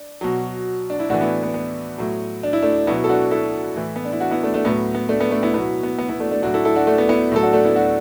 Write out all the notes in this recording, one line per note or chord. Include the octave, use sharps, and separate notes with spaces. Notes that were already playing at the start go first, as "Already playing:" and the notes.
Already playing: D4
B2 F#3
D4
E4
A2 E3 D4 F#4
B3 E4
B3
B3
A2 F#3
D4
E4
A3 D4
B2 F#3 B3 E4
A4
D4 F#4
E4 A4
A2 E3
B3
D4
E4
D4 F#4
B3 E4
A3 D4
A3 D4
A2 F#3 B3
B3
A3 D4
B3
A3 D4
B3 E4
B2 F#3 B3 E4
B3
B3
B3 E4
A3 D4
A3 D4
A2 F#3 D4 F#4
E4 A4
E4 A4
D4 F#4
A3 D4
B3
B3 E4
A2 F#3 A4
D4 F#4
A3 D4
B3 E4
D4 F#4